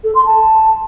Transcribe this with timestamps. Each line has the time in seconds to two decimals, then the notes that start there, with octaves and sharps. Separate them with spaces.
0.04 A4
0.15 C6
0.26 A5